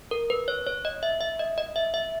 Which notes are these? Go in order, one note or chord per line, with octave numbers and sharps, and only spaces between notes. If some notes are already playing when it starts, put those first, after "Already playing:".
A#4
B4
C#5
C#5
D#5
E5
E5
D#5
D#5
E5
E5